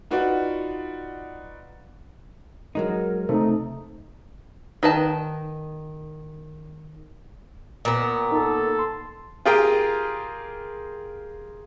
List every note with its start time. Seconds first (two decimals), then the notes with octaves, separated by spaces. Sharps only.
0.11 D#4 F4 F#4 B4 D5 F#5
2.75 F#3 G#3 D#4 A#4
3.29 C3 A3 D#4
4.83 D#3 B4 A5
7.85 A#2 B3
8.31 D#4 A4 A#4
8.79 C6
9.46 F4 G4 G#4 A#4 G5